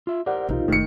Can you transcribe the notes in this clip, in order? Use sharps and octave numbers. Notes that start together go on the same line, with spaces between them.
F4 E5
G4 A#4 C5 D5 F#5
B1 E2 B2 D#4 F4
F#1 D#3 A3 C#7